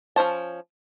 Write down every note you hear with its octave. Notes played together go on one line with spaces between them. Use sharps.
F3 C#4 C5 A5